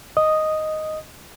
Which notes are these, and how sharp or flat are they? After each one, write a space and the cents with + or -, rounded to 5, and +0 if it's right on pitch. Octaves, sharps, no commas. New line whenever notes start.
D#5 +0 D#6 +0